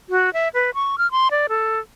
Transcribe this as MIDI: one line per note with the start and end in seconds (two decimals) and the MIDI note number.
0.09 0.33 66
0.33 0.49 76
0.54 0.70 71
0.74 0.96 85
0.98 1.10 89
1.11 1.28 84
1.31 1.47 74
1.49 1.80 69